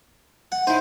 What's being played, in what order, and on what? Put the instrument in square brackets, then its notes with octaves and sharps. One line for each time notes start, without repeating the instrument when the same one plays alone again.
[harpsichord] F#5
[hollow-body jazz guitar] D#4 E4 [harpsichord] C5